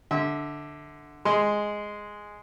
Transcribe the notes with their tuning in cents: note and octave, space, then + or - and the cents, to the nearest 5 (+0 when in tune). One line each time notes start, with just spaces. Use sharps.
D3 +0 E5 -30
G#3 +0 C6 +0